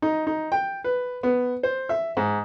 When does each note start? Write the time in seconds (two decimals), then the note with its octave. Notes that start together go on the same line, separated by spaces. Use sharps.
0.02 D#4
0.27 D#4
0.52 G5
0.84 B4
1.23 B3
1.63 C5
1.89 E5
2.17 G#2